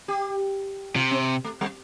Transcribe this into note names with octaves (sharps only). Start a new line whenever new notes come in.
G4
C3 F4
C4
A3
G3